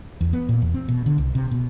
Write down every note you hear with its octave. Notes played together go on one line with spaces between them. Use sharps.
E2
B3
A#2
E2
C4
B2
D3
C2
C3
B2